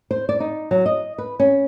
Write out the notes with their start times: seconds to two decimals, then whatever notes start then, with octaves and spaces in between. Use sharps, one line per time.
0.11 C5
0.29 D5
0.40 D#4
0.71 F#3
0.86 D#5
1.18 B4
1.40 C#4